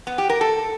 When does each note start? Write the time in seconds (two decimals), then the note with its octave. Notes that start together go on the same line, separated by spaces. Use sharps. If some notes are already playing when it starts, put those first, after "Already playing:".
0.07 B3
0.18 G4
0.29 A#4
0.41 A4